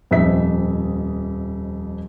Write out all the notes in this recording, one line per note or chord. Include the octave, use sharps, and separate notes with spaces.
D#1 F2 D#5 E5 B6